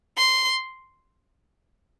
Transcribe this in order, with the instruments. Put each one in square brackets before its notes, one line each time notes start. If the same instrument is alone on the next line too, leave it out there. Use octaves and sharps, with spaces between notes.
[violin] C6